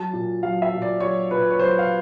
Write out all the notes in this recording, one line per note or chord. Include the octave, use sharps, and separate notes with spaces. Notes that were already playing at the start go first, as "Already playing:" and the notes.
Already playing: F#3 A5
A#2
F#3 F5
E5
A#2
D5
F#3 C#5
A#2 B4
C#5
F#3 C5
F5